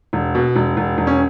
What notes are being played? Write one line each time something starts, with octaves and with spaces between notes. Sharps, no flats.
E1
B2
E1
E1
E1
C#4